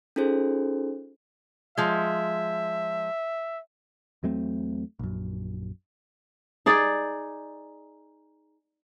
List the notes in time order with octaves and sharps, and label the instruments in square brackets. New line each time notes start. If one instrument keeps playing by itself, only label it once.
[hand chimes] C#4 D#4 F4 G#4 A4 C5
[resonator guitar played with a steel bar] F3 G#3 [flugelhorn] E5
[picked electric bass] E2 F#3 A3 C4
A#1 F#2
[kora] D#4 G#4 D5